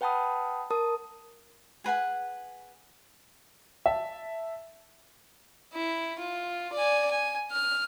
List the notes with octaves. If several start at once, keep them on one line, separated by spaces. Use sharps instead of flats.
B4 F#5 G5 A5 B5 D#6
A#4 A5 D#6
G#4 B4 F#5 G#5
E5 A5
E4
F4
D5 G#5
G#5
F6